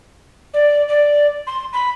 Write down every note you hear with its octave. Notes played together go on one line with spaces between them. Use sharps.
D5
D5
C6
B5